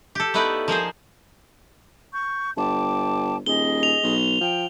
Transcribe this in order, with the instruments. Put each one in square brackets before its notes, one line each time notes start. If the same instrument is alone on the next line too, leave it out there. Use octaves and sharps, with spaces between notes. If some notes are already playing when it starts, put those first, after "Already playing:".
[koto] G4 A4
A3 B3 D#4 E4 B4 D5
F3 A#3 G#4 C5
[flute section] C#6 G6
[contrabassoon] G1 [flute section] G5 A5 D6
[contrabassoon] D#1 [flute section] G#4 D#5 [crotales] G7
[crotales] F7
[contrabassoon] B1
[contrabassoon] F3 [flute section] G5